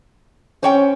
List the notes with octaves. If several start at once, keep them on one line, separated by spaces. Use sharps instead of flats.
C#4 C5 C#5 G5